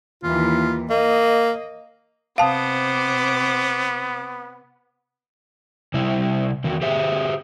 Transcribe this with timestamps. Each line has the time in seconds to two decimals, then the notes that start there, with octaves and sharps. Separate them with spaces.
0.24 D#2 E3 F4
0.90 A#3 D#5
2.38 C3 B3 C5 F5 A5 D6 D#6
5.94 C3 G3 E4
6.64 E2 D#3 F#4
6.82 G4 G#4 C5 E5